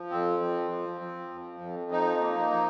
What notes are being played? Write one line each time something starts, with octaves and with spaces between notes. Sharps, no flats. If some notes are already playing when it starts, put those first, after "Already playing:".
Already playing: F3
F2 C4
F3
F3
F3
F2
F2
F3 D#4
A#3
F3